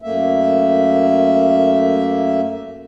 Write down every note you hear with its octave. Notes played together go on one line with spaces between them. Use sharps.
F#2 A3 A#3 E5